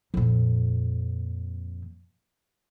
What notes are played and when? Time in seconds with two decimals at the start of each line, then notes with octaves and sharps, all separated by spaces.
0.14 F2 A#2